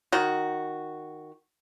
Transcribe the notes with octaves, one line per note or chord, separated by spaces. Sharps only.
D#3 F#4